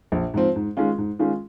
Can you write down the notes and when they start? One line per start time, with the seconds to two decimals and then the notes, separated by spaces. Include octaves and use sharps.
0.12 A#1
0.34 G#2 F3 C4
0.56 G#2
0.77 D#3 G#3 C#4 F4
0.98 G#2
1.19 D#3 G#3 C#4 F4